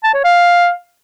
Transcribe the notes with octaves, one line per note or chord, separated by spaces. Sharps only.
A5
C#5
F5